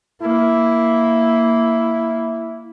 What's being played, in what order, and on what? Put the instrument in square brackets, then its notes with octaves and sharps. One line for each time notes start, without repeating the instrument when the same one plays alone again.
[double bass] A#3 [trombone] E4